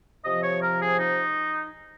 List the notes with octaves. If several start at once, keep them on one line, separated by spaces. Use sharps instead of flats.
C3 F3 D#5
C#5
A#4
G#4
D#4